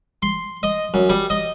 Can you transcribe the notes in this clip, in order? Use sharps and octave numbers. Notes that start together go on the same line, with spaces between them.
C6
D#5
F#2
G3
D#5